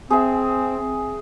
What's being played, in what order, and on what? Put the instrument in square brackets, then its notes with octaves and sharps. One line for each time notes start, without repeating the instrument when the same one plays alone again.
[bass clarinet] C4 [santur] G#4 E5